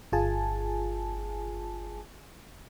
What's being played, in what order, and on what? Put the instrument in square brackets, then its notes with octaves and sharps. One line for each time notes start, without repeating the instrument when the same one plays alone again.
[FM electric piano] G1 F4 G#4 G#5 A5